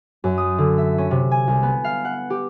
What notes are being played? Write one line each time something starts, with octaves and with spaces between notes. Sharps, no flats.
F#2
D#6
D3
E5
C#4
C3
G#5
C2
B3
F5
F#5
G4